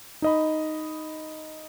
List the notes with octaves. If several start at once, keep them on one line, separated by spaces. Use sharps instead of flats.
D#4 D#5 B5